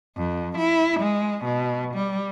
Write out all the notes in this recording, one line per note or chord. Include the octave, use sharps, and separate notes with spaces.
F2
E4
G#3
B2
G3